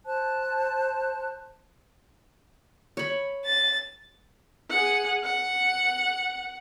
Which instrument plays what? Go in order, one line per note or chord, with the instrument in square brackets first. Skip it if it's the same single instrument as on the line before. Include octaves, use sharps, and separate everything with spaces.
[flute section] C5 A5 F#6
[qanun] C#5 B5
[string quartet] A6
[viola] G#4 F#5
F#5